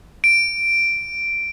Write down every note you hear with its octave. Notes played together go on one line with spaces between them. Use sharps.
D7